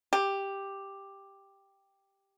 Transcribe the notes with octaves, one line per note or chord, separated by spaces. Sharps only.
G4